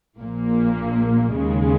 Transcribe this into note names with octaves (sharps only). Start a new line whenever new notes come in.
A#1 A#2 A#3
D#2 C#3 G#3